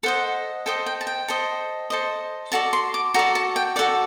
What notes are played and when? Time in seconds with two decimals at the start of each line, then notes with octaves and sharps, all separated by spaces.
0.03 A4 C5 D#5 F#5
0.66 A4 C5 D#5 G5
0.86 G5
1.01 A5
1.07 G5
1.28 A4 C5 D#5
1.90 A4 C5 D#5
2.52 F#4 A4 D5 A5
2.73 C6
2.94 D6
3.14 F#4 A4 D5 A#5
3.35 A5
3.56 G5
3.76 F#4 A4 D5 F#5